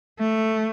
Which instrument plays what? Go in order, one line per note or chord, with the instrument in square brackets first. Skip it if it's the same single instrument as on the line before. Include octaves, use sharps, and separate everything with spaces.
[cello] A3